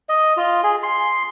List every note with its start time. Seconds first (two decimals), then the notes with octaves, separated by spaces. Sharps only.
0.09 D#5
0.37 F4
0.64 G#4
0.83 C6